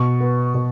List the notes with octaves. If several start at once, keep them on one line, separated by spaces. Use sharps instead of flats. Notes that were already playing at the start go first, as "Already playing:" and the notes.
Already playing: B2 C#6
B3
B2